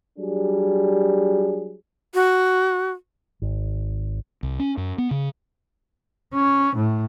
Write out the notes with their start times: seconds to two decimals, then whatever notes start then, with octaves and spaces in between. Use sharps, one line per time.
0.18 F#3 G3 D4 G#4
2.15 F#4
3.42 G#1
4.43 C2
4.59 C#4
4.77 F#2
4.98 B3
5.11 C#3
6.34 C#4
6.76 A2